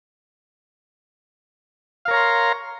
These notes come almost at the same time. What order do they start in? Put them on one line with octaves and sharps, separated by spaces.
F5 A#4 C#5 A#5 C6